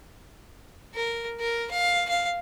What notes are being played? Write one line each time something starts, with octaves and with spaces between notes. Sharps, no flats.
A#4
A#4
F5
F5